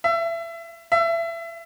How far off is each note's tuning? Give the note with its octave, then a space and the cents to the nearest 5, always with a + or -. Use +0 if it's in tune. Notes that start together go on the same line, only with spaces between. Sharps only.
E5 +25
E5 +25